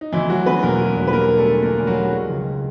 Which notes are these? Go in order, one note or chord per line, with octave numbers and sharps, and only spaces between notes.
D#4
D2 E3 E4
D2 F#3 F#4
D3 B3 B4
E1 A#3 A#4
D3
E1
B4
G3 A#3 A#4
G3
A3 A4
D3
D3 A#3 A#4
D2
F#3 F#4
G3
G#3
C#2